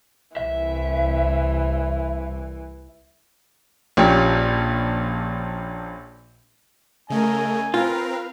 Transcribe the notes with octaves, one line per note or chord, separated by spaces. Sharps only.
C2 E3 E5
A#1 A#2 C#4 G4
C#3 A3 A#4 D#5 G#5
C4 F4 A#4 B4 F5